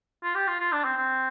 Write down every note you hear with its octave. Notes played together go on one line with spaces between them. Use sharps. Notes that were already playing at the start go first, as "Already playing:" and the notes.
F4
G4
F4
F4
D4
C4
C4